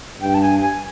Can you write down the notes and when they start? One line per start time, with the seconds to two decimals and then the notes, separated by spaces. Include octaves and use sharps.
0.21 G2 G5
0.34 A5
0.42 G#5
0.62 G#5